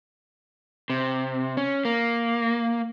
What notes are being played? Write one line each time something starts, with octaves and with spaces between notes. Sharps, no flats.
C3
C#4
A#3